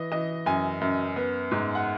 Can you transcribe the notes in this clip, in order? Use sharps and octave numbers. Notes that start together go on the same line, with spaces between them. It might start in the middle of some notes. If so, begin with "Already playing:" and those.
Already playing: E3 D#5
E3 D#5
F#2 G#5
F#2
B3
G#2
F#5